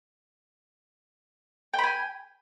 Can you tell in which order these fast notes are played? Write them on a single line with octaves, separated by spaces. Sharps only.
G5 B5 G#5